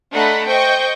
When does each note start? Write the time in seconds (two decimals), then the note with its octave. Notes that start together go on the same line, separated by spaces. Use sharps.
0.12 A3 D4 D#5 F#5 A#5 B5
0.46 C5 D#5 G5 C#6 G6